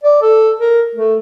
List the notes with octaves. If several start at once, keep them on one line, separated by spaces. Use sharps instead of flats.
D5
A4
A#4
A3